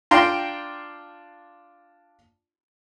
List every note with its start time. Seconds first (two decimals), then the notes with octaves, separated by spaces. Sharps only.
0.11 D4 F4 G5 A#5 C6